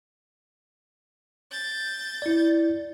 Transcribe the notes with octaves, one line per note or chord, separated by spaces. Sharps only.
G6 A6
E4 D5